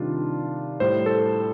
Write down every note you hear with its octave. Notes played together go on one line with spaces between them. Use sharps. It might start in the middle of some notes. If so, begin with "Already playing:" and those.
Already playing: C3 D#3 G3 D4 F4
A2 G3 C5
A4 C5